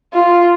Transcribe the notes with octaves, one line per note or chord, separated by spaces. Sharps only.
F4